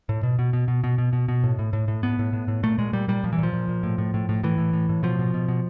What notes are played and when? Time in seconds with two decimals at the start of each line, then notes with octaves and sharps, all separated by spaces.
0.09 A2
0.23 B2
0.39 B2
0.53 B2
0.68 B2
0.84 B2
0.98 B2
1.13 B2
1.28 B2
1.44 A2
1.59 A2
1.73 A2
1.88 A2
2.03 A2 B3
2.19 A2
2.33 A2
2.48 A2
2.63 A#2 A3
2.78 A#2 G#3
2.93 A#2 G3
3.08 A#2 G3
3.24 A#2 F3
3.33 E3
3.38 A#2 F3
3.53 A#2
3.69 A#2
3.83 A2
3.98 A2
4.14 A2
4.29 A2
4.43 A2 E3
4.58 A2
4.73 A2
4.89 A2
5.03 B2 F3
5.19 B2
5.34 B2
5.48 B2